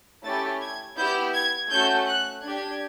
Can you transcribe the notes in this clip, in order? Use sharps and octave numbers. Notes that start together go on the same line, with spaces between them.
A3 C#4 E4 G4 A6
G#6
B3 E4 G4 G6
G#6
A3 C#4 F#4 A4 G6
F#6
D4 G4 G#6